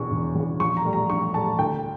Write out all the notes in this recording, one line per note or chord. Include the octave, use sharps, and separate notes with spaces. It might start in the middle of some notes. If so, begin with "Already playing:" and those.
Already playing: E1 E2 C#3 C#6
E1
E2 C#3
A#1 C#6
A#5
A2 G3
A#5
A#1 C#6
A2 G3 A5
D2 G5